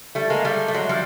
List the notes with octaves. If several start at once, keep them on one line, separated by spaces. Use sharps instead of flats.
G3 A3
G#3 A#3
G3 A3
A3
F#3 G#3
F3 G3